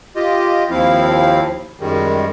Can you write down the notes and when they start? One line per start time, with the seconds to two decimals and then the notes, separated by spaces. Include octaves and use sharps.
0.16 F4 G4 D#5
0.70 D#2 F3 C4 E4 F5
1.80 F#2 D#3 G3 G#3